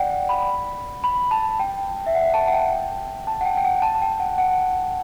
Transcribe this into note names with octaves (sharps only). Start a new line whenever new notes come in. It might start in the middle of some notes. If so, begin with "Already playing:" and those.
Already playing: D5 F#5 G5
G5
B5
B5
A5
G5
E5
F#5
A5
F#5
G5
A5
F#5
G5
G5
F#5
A5
A5
G5
F#5
F#5